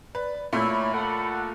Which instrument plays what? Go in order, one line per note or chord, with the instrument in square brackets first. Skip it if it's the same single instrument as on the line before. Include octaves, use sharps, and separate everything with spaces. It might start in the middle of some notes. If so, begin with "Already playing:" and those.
[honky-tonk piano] B4 [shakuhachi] D5
[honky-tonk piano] A#2 A3 [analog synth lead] E4 [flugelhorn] C#5 [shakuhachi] B5
[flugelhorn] A4 [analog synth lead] F#5